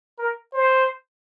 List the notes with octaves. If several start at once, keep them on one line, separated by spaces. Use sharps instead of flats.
A#4
C5